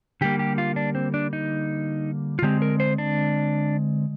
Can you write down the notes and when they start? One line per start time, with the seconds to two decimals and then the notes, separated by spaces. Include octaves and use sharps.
0.21 D3 G3 A#3 G4
0.39 G4
0.58 F4
0.76 D4
0.95 C4
1.14 D4
1.33 D#4
2.39 F4
2.42 D3 G#3 C4 G4
2.62 A#4
2.80 C5
2.98 D4